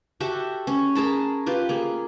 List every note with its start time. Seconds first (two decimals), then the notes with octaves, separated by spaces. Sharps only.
0.20 F#4 G4 A4 E5
0.67 C#4
0.95 G#4 A#4 A5 B5
1.46 F4 G4 B4
1.69 A#3 G#4